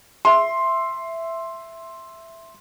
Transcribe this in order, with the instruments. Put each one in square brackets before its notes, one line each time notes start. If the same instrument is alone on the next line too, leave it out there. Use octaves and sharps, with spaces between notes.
[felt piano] E5 C6